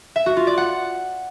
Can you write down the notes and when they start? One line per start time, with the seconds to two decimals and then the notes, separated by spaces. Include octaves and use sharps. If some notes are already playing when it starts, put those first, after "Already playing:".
0.16 E5
0.26 F#4
0.37 F4
0.47 D5
0.57 F#5